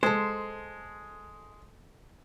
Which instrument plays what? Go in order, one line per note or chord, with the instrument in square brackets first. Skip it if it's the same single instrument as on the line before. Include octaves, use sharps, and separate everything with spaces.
[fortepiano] G#3 [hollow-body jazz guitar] A4 C5